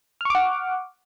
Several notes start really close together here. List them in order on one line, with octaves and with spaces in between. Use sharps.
F6 C#6 D6 F#5